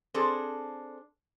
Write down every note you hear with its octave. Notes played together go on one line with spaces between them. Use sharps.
C4 D4 G#4 A4 C5